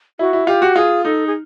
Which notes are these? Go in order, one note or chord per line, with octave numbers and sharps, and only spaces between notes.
E4 F#4
E4
F4 G4
F#4
F4 G#4
D#4 A4
G#4